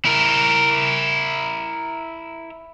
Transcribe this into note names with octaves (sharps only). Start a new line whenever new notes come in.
E4 A#4